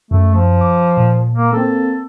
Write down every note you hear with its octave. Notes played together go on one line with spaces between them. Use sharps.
F#2 A3
F3
D6
A#2
A#3
A#3 C4 A4